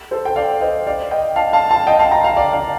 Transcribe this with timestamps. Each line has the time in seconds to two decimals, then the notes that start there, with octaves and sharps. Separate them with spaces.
0.11 A4 C5
0.25 G5
0.36 D5 F5
0.61 C5 D#5
0.87 D5 F5
1.11 D#5 G5
1.36 F5 A5
1.53 F5 A5
1.69 F5 A5
1.87 D#5 G5
1.99 F5 A5
2.12 G5 A#5
2.24 F5 A5
2.37 D5 F5
2.53 D5 F5